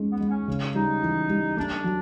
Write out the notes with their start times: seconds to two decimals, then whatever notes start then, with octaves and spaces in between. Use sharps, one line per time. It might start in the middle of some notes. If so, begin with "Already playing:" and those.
Already playing: G#3 C#4
0.11 B3
0.21 G#3
0.29 C#4
0.48 C#3
0.75 G3 D#4
1.03 E3
1.30 G3
1.57 A3 D4
1.84 F#3